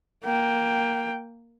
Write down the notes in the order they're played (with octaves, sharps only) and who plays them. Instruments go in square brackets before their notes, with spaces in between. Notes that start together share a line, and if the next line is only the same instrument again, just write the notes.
[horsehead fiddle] A#3 G5